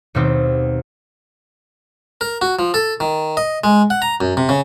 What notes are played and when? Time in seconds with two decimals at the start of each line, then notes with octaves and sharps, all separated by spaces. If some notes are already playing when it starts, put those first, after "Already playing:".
0.15 D#2 B2 G3 C4 D#4 C5
2.21 A#4
2.42 F#4
2.59 F3
2.74 A4
3.00 D#3
3.37 D#5
3.64 G#3
3.90 F#5
4.02 A#5
4.21 F#2
4.37 C3
4.49 C#3